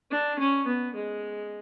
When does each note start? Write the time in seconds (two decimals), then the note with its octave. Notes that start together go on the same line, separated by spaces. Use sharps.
0.11 D4
0.39 C#4
0.67 B3
0.95 G#3